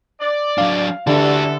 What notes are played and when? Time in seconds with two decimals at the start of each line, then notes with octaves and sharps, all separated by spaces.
0.20 D5
0.58 F#3 D4 F5
1.07 D3 E3 G3 D4 F#4 A4